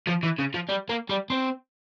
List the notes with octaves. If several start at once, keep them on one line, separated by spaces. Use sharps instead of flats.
F3
E3
C#3
F3
G3
A#3
G3
C4